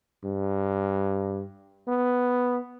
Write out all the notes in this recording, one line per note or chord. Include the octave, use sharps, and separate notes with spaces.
G2
B3